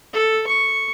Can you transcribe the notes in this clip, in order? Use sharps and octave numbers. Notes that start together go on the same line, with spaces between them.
A4
C#6